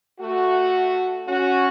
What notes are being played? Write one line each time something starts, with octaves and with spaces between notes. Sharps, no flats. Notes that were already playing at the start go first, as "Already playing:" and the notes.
A3 F#4
C#4 F#4